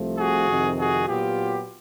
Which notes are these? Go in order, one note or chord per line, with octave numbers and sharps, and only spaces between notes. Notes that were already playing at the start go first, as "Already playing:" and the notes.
Already playing: C2 C3 F3 A3
F#4 G#4
F2 C3 D#3
F#4 G#4
A#2 F#3 B3 F4 G4